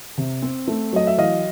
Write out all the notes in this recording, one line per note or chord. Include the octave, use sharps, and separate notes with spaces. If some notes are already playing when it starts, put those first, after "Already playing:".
C3
C4
A3
F#3 D#5
E5
E3 D#5 F5